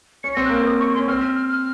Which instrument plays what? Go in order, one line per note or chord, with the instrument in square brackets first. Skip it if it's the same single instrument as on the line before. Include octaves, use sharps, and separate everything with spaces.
[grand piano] C#4 [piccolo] C#7
[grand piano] C4 [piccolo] A#6
[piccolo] F#6
[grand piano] A#3
[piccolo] F6
[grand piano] C4 [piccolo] D#6
[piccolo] C#6
[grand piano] C#4 [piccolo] C6
[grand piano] C4 [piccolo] F6
[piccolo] F6
F6
F6